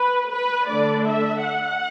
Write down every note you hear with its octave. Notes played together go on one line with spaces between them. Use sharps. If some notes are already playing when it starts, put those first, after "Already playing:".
Already playing: B4
B4
D3 A3 D4 D5
E5
F#5